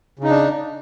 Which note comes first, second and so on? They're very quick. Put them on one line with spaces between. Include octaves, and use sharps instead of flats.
C#3 D#4 D4